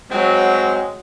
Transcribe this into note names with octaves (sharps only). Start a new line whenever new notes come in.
F#3 G#3 C4 F#5